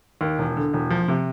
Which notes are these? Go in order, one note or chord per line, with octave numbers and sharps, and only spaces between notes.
D#2
E1
D3
E1
F3
C3